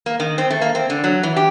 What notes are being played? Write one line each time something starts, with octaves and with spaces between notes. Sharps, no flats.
A#3
D#3
C4
A3
A#3
C4
D3
F#3
E3
G4